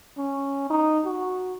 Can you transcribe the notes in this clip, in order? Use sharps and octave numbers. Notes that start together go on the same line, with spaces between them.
C#4
D#4
F#4